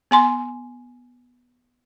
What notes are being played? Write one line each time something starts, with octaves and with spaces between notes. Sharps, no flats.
B3 G#5 C6